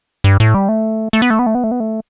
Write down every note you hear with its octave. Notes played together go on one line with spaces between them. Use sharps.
G2
A2
G3
A3
A3
B3
A3
B3
A3
B3
A3
B3
A3